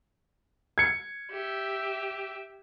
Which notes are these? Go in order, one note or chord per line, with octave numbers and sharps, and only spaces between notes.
G#6 C#7
G4 E5